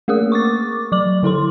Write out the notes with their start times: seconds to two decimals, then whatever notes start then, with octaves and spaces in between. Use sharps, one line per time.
0.08 A3 A#3 G#4 A#4 D#6
0.32 C#6 D6 A6
0.92 F#3 D6 F#7
1.23 D3 E4 A4 C6